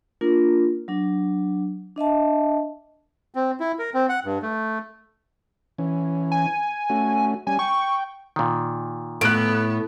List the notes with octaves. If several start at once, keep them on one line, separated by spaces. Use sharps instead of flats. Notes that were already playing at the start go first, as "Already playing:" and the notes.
A#3 D4 F4 A#4
F#3 D4
D4 D#5 E5 A5
C4
E4
A#4
C4
F#5
G2
A3
E3 C#4
G#5
A3 C#4 F#4
G3 C#4 G#5
G5 C#6
A#2 D#3
A2 B3 F#6 D7